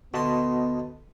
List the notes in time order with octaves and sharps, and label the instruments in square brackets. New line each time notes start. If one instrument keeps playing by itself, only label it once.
[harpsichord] D2 C6 [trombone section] B3 [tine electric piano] F#4 D#5 A5